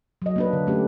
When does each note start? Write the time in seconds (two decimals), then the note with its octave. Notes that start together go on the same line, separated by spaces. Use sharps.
0.22 F#3 D#5
0.36 A#3 D4 B4
0.53 D3
0.67 A3 C#4 G4